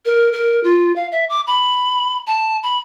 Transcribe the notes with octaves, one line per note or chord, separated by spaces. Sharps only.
A#4
A#4
F4
F5
E5
D6
B5
A5
B5